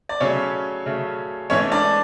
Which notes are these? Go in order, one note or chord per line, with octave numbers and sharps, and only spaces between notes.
D5
C#3 F#3 A3 C#4 C#5
C#3 F#3 A3
G#2 E3 A3 C#4 C#5
D4 D5